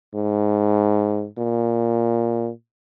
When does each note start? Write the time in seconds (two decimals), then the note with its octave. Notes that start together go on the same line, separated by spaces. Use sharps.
0.15 G#2
1.38 A#2